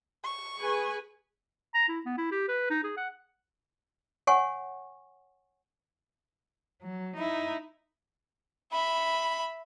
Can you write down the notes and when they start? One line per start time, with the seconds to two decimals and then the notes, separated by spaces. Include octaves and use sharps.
0.24 C#6
0.59 G#4 B4 G#5
1.74 A#5
1.89 E4
2.05 B3
2.18 E4
2.31 G4
2.48 B4
2.70 D#4
2.84 G#4
2.97 F#5
4.27 C#5 F#5 G#5 C#6
6.83 F#3
7.16 D#4 E4
8.72 E5 B5